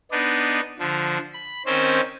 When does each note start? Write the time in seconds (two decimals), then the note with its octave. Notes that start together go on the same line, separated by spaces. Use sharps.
0.11 B3 D4 D#4
0.79 D3 F3
1.33 B5
1.66 D#3 C4 C#4 C5